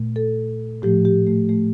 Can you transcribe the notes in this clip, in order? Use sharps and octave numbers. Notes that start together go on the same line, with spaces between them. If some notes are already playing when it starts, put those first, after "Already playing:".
Already playing: A#2 A3
A4
A2 F3 A3 G4
G4
A3
A3